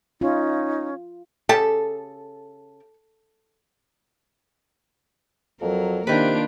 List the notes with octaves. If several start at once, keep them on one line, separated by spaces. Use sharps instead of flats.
C#4 D#4 F4
C#3 G4 A4 A5
F2 F#3 A#4
C3 D#3 A#3 D4 F4 B4 D7